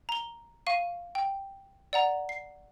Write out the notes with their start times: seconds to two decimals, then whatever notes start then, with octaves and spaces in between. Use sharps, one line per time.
0.09 A#5 G7
0.67 F5 C#6 D#7
1.15 G5
1.93 D5 F#5 A#5
2.29 C7